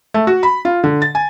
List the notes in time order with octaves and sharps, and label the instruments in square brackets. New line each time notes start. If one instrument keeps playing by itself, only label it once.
[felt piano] A3
F#4
B5
F4
D3
A6
G#5